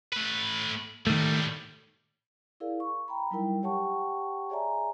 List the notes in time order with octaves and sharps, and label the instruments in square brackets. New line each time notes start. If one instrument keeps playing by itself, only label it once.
[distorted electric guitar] A3 B4
[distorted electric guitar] A2 G3 [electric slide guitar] D#3 A3
[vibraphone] E4 G#4 A#4 D5 F5
C#6
G5 A#5 B5
F#3 G3 D#4 E4 A#4 G5
G4 C#5 F#5 G5 A5 C#6
G#4 C#5 D5 E5 G#5 A#5